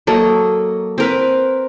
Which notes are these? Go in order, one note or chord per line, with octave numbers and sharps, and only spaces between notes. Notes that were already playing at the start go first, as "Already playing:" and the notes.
F#3 A#3 A4 D#5
C4 A#4 B4